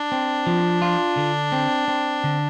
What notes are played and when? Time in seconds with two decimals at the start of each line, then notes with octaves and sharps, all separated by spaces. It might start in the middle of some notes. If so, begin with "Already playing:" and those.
Already playing: D4
0.12 C4
0.47 F3
0.82 F4
1.17 D3
1.52 C4
1.88 C4
2.24 D3